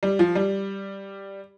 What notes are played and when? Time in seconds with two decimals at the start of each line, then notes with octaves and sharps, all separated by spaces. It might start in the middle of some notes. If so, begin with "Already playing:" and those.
0.03 G3
0.19 F3
0.35 G3